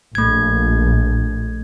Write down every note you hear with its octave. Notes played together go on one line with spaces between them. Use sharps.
A#1 A3 G#6